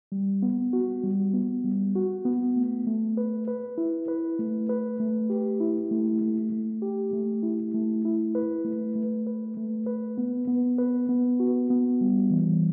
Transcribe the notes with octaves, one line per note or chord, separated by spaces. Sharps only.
G3
B3
F#4
G3
B3
G3
F#4
B3
A3
A3
B4
B4
E4
B4
A3
B4
A3
G4
E4
A3
A3
A3
G4
A3
E4
A3
E4
B4
A3
A3
B4
A3
B4
B3
B3
B4
B3
F#4
B3
G3
E3